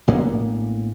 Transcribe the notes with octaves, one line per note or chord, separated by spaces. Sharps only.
A#1 A2 A#3 B3